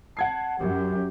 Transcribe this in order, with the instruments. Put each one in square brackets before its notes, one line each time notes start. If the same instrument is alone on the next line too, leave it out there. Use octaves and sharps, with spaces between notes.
[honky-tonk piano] F#5 G#6 C7 [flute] A5
[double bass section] F#2 [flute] G4